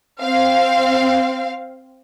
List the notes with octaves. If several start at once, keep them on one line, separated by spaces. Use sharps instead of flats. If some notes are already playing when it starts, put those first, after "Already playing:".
C4 F5